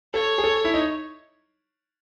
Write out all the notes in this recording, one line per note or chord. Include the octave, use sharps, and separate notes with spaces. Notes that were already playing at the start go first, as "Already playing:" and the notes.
A4 C#5
G#4
A4
E4
D#4